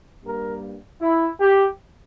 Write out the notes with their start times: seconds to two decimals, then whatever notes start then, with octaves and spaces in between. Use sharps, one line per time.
0.24 G2 G3 A#3 A#4
1.01 E4
1.40 G4